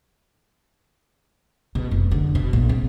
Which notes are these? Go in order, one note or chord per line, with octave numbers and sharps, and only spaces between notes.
B2
F1
D3
B2
A#1
C3